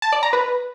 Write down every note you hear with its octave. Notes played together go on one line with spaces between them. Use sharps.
A5
D5
A#5
B4